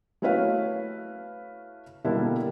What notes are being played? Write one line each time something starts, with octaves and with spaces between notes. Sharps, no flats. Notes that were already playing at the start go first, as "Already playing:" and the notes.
A3 C#4 E4 F#4 B4 F5
B2 D3 G3 A#3 D4 E4